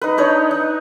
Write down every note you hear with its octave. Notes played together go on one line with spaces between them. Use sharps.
D#4 B4
D4 D#4 C#5
D#4